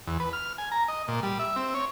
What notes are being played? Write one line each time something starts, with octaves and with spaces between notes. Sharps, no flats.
E2
B4
F6
G#5
A#5
D#5
A#2
G3
E5
C4
C#5